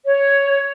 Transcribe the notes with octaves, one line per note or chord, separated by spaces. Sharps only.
C#5